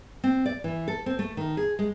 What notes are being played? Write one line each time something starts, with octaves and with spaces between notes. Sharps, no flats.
C4
D5
E3
A4
C4
A3
D#3
G#4
G#3